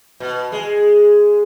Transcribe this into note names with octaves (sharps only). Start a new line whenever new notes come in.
B2
G#3